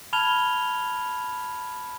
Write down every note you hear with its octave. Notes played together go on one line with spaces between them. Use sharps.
A5 B5 F6 G#6 F7 G7